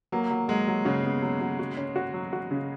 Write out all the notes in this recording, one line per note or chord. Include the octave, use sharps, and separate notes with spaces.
F#3 A#3
F#3
F#3 G#3
F#3
C#3 F#4
B3
F#3
F#3
F#4
C#4
F#4
F#3
F#4
C#3